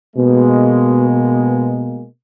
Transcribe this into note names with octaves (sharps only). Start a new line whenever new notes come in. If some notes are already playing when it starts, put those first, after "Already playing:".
B2 G#3 A#3